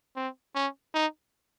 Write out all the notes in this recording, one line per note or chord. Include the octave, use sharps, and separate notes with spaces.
C4
C#4
D#4